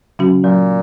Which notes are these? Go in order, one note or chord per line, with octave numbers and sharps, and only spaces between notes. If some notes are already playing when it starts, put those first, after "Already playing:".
C#3 F#3 C#4 F#4
A#2 F#3